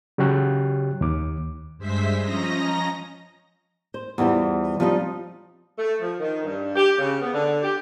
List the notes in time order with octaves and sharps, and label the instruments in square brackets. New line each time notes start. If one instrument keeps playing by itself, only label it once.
[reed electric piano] C#3 F#3 G4 C#5 G5 F#6
D#2 D6
[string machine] G2 G#3 C5 E5 B6
F3 C#4 D#5 A#5 A#6
[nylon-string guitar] C5
E2 E3 G3 F4 C5
F3 G3 C4 D4 D#4
[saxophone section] A3
F3
D#3
G2
G4
C#3
B3
D3
G4